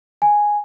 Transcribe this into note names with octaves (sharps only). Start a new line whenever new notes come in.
G#5